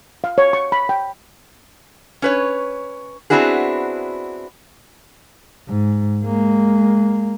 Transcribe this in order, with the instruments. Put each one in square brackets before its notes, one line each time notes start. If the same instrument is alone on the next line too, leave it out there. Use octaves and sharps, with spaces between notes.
[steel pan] F5
C#5
C#6
B5
G5
[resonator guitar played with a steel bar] C#4 B4 C#5
B3 C4 D4 E4 F#4 G#4
[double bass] G#2
G#3 A#3